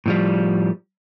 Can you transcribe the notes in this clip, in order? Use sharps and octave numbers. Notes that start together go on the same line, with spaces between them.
A2 F3 G3